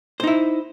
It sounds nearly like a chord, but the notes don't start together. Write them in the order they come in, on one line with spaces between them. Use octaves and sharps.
C5 D#4 E4